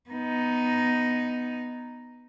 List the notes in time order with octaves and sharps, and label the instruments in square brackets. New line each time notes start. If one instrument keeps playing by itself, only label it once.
[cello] B3 D#4